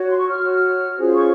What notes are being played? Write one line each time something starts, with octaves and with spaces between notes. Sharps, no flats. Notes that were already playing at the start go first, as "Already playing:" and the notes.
Already playing: F#4 C#5
C6
C#6
F6
F#4 C#5
C#4 F4 G#4 C5
C#6